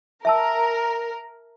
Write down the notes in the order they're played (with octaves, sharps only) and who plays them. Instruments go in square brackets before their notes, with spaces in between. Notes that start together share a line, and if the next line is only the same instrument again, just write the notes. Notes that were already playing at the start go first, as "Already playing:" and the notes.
[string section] A#4 [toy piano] E5 A5 E6